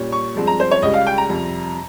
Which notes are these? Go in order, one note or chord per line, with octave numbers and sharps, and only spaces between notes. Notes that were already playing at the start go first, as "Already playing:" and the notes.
Already playing: A#2 G3 C#4
C#6
G2 F3 G#3 C4
A#5
C5
C#5
C#2 C#3 G3 D#5
F5
G5
A#5
F2 C3 G3